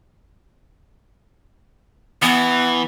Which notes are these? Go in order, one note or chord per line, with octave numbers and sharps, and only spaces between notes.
E3 B3